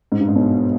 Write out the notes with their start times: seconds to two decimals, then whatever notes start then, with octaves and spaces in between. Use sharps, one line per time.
0.12 G#2
0.20 G2
0.28 G#2
0.35 B1 B2